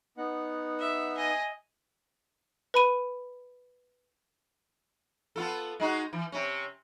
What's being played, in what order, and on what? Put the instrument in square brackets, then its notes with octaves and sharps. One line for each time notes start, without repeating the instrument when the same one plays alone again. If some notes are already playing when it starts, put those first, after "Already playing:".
[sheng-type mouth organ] B3 D#4 F#5
[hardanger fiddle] E5
[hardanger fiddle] D#5 [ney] G#5
[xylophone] B4 B5 D#7
[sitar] B3 F4 A4
G#3 D#4 F#4
E3
C3 C#4